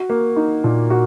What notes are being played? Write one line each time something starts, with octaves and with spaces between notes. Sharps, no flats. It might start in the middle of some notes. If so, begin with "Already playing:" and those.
Already playing: F#4
A#3
D#4
A#2
F#4